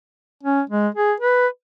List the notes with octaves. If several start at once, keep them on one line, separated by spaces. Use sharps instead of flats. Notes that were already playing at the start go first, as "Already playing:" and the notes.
C#4
G#3
G#4
B4